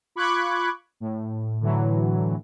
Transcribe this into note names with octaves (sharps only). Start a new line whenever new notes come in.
F4 B5 C#6 D6 F#6 G#6
A2
A2 D3 E3 F#3